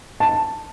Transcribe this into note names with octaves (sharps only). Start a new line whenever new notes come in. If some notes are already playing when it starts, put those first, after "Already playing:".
A5